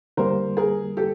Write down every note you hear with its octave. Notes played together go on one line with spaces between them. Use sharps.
D3 G3 A#3 A#4 C5
G#4 A#4
G4 A4